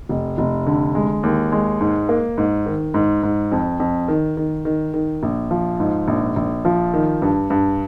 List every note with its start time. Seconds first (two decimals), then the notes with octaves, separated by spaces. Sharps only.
0.09 F1
0.38 F1
0.66 D3
0.95 G#3
1.23 D#2
1.52 G#3
1.81 G#2
2.09 A#3
2.38 G#2
2.66 D#3
2.94 G#2
3.23 G#2
3.52 F2
3.80 F2
4.08 D#3
4.37 D#3
4.65 D#3
4.94 D#3
5.23 A#1
5.51 F3
5.80 G#2
6.08 A#1
6.36 A#1
6.65 F3
6.94 D#3
7.22 G2
7.50 G2